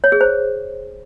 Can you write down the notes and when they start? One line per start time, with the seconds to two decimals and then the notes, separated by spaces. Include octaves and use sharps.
0.04 C#5
0.12 G#4
0.21 C5